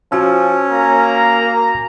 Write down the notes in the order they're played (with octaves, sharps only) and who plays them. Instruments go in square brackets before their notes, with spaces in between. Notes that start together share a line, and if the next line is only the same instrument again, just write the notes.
[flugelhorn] F3 [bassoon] C#4 [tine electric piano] F#4 G#5 E6
[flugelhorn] A#3 [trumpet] A#5